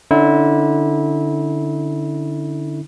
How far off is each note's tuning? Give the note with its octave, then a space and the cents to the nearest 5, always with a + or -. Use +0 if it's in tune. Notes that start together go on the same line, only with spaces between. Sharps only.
D3 +5 C#4 +0 E4 -25